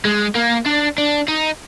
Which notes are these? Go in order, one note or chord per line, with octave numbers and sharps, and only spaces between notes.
G#3
A#3
D4
D4
D#4